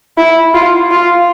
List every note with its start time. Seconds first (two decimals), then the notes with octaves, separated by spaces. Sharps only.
0.18 E4
0.54 F4
0.91 F4